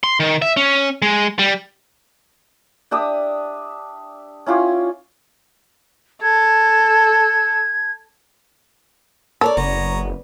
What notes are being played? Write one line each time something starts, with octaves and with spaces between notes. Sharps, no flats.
C6
D#3
E5
C#4
G#3
G3
D4 G4 E5 D#6
C#4 E4 F4 G4
A4 G#6
A4 A#4 C#5 D5
F#1 B3 C#5 A#5